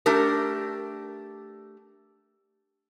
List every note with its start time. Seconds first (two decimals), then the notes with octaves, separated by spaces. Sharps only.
0.06 A3 D4 G4 A#4